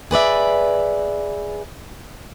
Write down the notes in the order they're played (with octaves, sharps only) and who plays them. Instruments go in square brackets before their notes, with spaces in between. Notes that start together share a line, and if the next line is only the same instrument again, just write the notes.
[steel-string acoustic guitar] G#4 B4 D5 E5